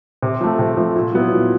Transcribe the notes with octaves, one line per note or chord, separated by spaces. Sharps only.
C3
F3 A3
C3
F3 A3
A#2
F#3 B3 E4
A#2